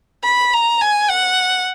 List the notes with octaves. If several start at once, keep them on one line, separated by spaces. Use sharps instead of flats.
B5
A#5
G#5
F#5